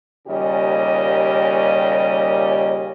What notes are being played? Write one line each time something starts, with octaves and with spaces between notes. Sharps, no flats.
D#2 A#2 C#3 G3 G4 D#5